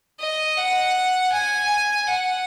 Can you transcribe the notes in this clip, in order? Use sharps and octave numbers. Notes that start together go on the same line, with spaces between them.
D#5
F#5
G#5
F#5